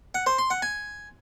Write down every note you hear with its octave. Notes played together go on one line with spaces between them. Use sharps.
F#5
C5
C6
F#5
G#5